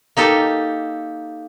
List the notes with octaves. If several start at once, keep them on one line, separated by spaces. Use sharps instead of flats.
A#3 D#4 G4 A4